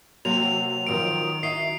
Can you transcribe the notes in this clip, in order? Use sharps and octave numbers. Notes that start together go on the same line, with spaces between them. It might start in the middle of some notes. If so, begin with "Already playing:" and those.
C3 F#3 A#3 C4 F7
D#3 F3 C4 D7
E4 F#4 D#5 C7